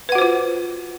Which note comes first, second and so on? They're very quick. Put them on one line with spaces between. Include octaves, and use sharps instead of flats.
B4 F#5 F#4 C5 F4